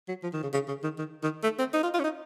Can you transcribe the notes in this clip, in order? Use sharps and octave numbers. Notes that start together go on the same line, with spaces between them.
F#3
F3
D#3
C#3
C#3
C#3
D#3
D#3
D#3
A3
C4
D#4
F4
F4
C#4
D#4